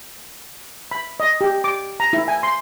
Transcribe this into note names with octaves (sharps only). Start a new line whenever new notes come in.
B5
D#5
G4
D6
A#5
E4
G#5
C6